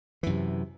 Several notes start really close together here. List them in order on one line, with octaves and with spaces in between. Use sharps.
E3 F#2 C3